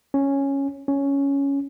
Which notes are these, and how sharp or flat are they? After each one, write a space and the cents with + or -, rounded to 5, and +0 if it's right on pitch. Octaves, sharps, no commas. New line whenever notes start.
C#4 -5
C#4 +5